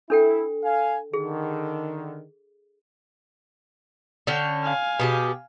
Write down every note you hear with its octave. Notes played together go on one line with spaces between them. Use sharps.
D4 E4 A4 G5
F5 G#5
D3 D#3 G#4
D3 C#4 G5
F5 G#5
B2 G4 G#4